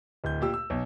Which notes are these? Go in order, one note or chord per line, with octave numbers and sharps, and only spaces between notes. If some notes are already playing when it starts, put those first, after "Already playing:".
D1 G6
A#2 G4 E6
E6
B1